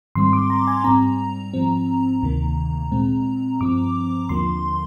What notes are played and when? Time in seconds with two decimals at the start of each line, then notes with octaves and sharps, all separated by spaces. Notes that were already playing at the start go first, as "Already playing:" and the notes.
0.15 G#2 D#3 G3 C4 C6
0.33 D6
0.50 A#5
0.67 G#5
0.84 G#2 G3 C4 A#5
1.53 G#2 F3 C4
2.23 D2 C3 D#3 A#3
2.91 A#2 G#3 C4
3.61 G2 F3 C4 D6
4.29 D#2 D3 F3 A#3 C6